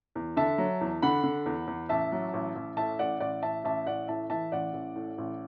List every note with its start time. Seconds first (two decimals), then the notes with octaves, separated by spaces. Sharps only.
0.15 E2
0.37 D3 E5 A5
0.58 F#3
0.81 E2
1.02 D3 F#5 B5
1.24 D3
1.46 E2
1.67 E2
1.89 A1 E5 A5
2.12 F#3
2.33 A1
2.55 A1
2.77 A2 E5 A5
2.99 A1 D5 F#5
3.20 A1 D5 F#5
3.42 A1 E5 A5
3.64 A1 E5 A5
3.86 A1 D5 F#5
4.08 A2 E5 A5
4.30 E3 E5 A5
4.52 A1 D5 F#5
4.74 A1
4.96 A2
5.18 A1